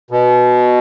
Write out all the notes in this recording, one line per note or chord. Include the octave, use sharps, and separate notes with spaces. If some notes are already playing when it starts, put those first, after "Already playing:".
B2